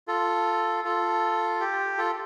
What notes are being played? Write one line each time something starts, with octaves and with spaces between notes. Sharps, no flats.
F4 A4
F4 A4
G4
F4 A4